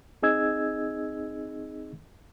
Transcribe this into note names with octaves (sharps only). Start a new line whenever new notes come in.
C4 D#4 G#4 D#5 E6 G#6